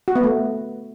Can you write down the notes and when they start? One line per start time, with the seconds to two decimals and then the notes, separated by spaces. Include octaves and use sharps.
0.08 F#4
0.16 B3
0.23 A3